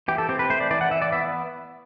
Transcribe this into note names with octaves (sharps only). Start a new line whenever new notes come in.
E3 G4
A4
C4 G4
B4
A3 C5
D5
E3 D5
F#5
E3 E5
D5
B3 E5